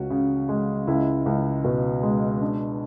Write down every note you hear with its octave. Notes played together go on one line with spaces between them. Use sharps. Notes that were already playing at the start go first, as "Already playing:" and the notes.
Already playing: C#2 C#4 F#4
C#3
G#3
C#2 E4
C#2
B2
G#3
D4